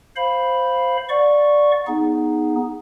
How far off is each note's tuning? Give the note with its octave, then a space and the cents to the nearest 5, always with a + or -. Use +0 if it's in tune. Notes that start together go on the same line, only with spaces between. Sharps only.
C5 +0 F5 +0 B5 +0
D5 +0 F#5 -35 C#6 +0
B3 -10 D#4 +0 G#4 +0